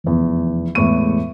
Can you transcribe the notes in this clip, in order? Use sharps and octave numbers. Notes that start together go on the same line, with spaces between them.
F1 E2
E2 A2 G#3 C#6 D#7